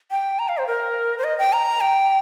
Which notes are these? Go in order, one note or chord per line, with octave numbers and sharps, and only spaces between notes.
G5
A#5
F5
C5
A#4
C5
D#5
G5
A#5
G5